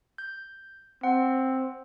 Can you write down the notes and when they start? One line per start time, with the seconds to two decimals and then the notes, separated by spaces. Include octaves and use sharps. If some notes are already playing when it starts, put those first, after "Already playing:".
0.18 G6
1.03 C4 F#5